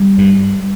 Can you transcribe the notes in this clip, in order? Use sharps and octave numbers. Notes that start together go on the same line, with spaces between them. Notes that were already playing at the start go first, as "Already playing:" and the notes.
Already playing: G3
G2